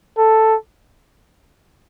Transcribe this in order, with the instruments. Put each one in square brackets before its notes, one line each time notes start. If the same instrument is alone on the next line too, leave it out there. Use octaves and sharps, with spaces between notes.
[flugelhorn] A4